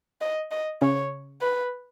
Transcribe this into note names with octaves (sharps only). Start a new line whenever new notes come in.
D#5
D#5
C#3 C#5
B4